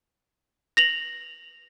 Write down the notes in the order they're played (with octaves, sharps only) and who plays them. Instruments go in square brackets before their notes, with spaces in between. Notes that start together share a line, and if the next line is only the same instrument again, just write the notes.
[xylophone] A#6 F7 F#7